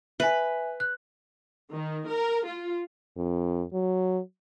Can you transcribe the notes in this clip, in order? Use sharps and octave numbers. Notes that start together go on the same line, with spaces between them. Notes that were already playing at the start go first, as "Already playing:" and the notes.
B4 E5 G#5
F#6
D#3
A#4
F4
F2
F#3